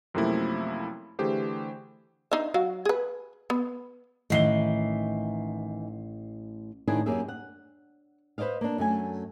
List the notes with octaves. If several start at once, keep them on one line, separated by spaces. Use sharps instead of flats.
F#2 C3 F3 A3 A#3 E4
D3 E3 A3 G4 G#4 C5
D4 D#4 E5
F#3 F#4 F5
G#4 B4
B3
A1 D#3 E3 C7 G7
A2 D#3 D4 E4 G#4
F#2 A#3 G4 G#4 E5
F#5
B4 C5 D5 D#5 F5
A#3 D4
F#2 A3 G#5